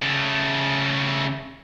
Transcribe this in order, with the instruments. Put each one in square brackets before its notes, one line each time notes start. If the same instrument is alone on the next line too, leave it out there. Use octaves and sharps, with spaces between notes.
[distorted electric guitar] C#3 A3